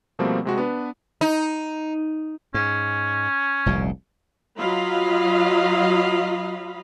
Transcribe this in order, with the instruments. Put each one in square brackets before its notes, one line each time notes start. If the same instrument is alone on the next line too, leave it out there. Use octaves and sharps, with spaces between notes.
[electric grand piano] B2 F3 G3 A3 A#3 C4
C3 G#3 F#4
B3 D4 B4
[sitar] D#4
[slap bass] G#2 [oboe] C#4
[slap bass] F1 C2 A#2
[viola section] F#3 F4 D#5 F5 B5